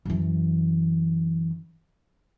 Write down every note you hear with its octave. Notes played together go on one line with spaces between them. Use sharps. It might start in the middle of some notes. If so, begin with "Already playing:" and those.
F#2 E3